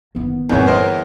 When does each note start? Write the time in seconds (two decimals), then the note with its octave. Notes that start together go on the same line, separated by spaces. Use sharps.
0.15 F#1 D#3 B3
0.49 E2 G2 A#2 D#3 E3 C4 C#5
0.67 G1 A#4 C5 C#5 D#5